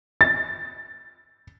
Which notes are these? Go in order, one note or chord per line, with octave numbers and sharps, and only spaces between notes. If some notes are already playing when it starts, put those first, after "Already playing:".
A6